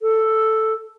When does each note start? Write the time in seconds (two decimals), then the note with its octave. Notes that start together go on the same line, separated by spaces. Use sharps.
0.01 A4